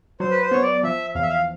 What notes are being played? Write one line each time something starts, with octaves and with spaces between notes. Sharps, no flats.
F#3 C5
B4
C5
B3 C#5
D5
F3 E5
E2 F5
E5
F5